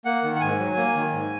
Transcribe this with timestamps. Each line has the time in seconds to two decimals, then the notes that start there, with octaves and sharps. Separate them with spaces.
0.05 A#3 F#5
0.24 D#3
0.35 F#5
0.41 G#2 G#5
0.59 F#3
0.77 A#3
0.95 D#3
1.13 G#2